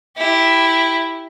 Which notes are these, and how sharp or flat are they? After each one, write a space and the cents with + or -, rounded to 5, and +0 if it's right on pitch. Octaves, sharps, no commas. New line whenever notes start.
E4 +0 G4 +0